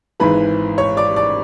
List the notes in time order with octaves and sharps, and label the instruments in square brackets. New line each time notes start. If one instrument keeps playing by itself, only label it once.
[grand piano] G#1 G#2 E3 B4 B5
C#5 C#6
D5 D6
D5 D6